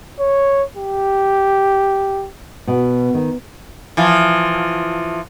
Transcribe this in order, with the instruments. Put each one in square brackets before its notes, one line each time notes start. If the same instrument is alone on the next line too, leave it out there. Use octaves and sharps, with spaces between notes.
[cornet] C#5
G4
[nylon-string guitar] B2
D#3
[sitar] E3 F3